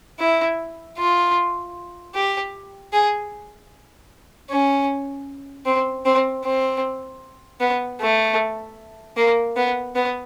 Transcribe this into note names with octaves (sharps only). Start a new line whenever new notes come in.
E4
F4
G4
G#4
C#4
C4
C4
C4
B3
A3
A#3
B3
B3